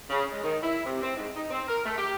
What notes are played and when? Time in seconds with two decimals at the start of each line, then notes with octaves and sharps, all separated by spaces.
0.10 C#3
0.32 G#3
0.43 D#3
0.63 E4
0.85 C3
1.02 C4
1.16 G#2
1.35 D#4
1.51 C4
1.68 A#4
1.85 A3
1.98 G4